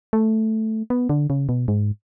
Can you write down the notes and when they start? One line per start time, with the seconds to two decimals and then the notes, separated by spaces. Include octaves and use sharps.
0.13 A3
0.90 B3
1.09 D3
1.30 C#3
1.49 B2
1.68 G#2